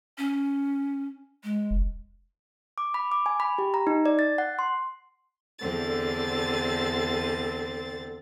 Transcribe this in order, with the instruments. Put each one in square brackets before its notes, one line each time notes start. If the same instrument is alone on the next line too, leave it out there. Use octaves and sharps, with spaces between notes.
[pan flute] C#4
G#3
[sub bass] F1
[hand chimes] D6
B5
D6
G#5
B5
G4
A#5
D#4
D5
A6
F#5
C6
[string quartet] E2 D3 C4 A6